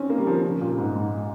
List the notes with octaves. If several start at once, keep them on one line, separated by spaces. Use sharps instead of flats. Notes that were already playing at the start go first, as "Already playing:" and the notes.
Already playing: C4 C#4
A#3
G3
F3
D#3
C#3
A#2
G#2
G#2